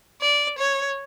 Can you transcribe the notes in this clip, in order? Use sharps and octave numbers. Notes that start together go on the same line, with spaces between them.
D5
C#5